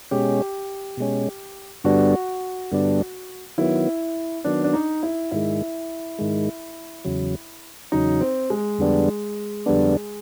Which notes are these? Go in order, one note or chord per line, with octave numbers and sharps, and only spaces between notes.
B2 G#3 C#4 G4
B2 G#3 C#4
G2 D3 G3 B3 D4 F#4
G2 D3 G3 B3 D4
D#3 F#3 B3 E4
D#3 F#3 B3 D4
D4
D#4
E4
G#2 D#3 G#3 E4
G#2 D#3 G#3
E2 C#3 F#3
E2 C#3 F#3 D#4
C4
G#3
F2 D3 G3 B3 D4
F2 D3 G3 B3 D4